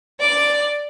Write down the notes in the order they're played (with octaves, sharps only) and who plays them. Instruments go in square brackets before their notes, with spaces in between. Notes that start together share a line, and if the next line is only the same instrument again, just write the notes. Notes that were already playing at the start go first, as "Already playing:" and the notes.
[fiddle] D5 D6